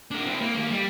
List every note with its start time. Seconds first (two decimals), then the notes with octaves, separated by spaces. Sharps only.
0.11 D4 A#4
0.26 C4 E4
0.41 A#3
0.55 D#2 A#3
0.71 G3